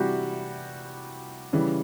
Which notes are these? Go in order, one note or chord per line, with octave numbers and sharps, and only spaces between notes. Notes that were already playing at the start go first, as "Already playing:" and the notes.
Already playing: C3 E3 G3 F#4 G4
C#3 E3 G3